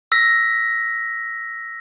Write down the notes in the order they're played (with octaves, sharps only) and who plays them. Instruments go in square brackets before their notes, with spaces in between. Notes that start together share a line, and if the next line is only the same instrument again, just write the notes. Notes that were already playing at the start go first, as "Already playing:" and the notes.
[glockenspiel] E6 A#6 B6